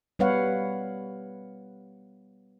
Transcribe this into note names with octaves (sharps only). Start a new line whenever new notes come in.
G3 B3 B4 C#5 F5 F#5